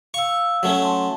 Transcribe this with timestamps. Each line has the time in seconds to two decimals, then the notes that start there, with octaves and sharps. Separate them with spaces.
0.14 F5 C#6 E6
0.63 F#3 A3 C#4
0.82 A5 C6